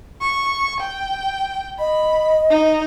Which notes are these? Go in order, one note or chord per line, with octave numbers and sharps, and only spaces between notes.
C#6
G5
D#5 B5
D#4